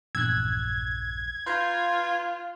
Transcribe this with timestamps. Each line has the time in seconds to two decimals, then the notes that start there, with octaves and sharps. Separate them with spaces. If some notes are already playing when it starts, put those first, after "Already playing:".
0.15 A#1 E2 G2 E6 F#6 G#6
1.46 F4 B4 F5 A#5 C6 G6 C7